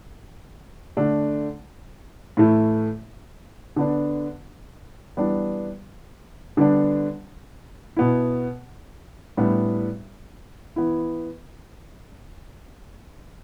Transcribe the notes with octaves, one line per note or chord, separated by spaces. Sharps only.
D3 A3 D4
A2 E3 A3 E4
D3 B3 D4
E3 G3 B3 D4
D3 G3 B3 D4
B2 B3 E4
A2 G3 B3 D4
E3 B3 E4